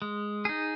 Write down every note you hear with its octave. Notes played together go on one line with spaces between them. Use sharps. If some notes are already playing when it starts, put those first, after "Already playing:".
G#3
D#4 G#4